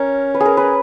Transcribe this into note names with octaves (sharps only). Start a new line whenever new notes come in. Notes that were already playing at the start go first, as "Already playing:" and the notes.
Already playing: C#4 A#4
B4
G#4
A#4
B4